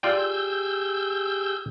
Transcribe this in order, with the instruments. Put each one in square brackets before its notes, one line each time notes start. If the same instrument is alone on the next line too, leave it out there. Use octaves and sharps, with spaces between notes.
[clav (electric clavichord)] F4 D5 G5 [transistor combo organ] G4 G#4 [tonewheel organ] E6 G6